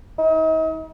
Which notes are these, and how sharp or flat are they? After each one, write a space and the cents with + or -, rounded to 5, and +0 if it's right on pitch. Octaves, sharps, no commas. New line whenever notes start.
D#4 +40